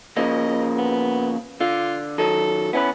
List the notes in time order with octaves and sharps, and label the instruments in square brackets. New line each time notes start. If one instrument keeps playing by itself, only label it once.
[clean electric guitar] C#3 F3 A#3 [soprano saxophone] D#5
[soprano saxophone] B3
[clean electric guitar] D3 [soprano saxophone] F4
[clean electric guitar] D#3 F#3 [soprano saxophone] A4
[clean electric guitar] B3 C#4 B4 [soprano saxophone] E4